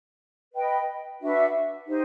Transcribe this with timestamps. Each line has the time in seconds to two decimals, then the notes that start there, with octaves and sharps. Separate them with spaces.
0.54 B4 D#5 G5
1.20 D4 F#4 B4 E5
1.86 D#4 G4 C5